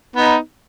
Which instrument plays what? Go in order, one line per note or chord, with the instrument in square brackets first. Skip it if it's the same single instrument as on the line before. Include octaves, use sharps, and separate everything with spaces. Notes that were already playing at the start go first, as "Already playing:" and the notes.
[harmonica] B3 D#4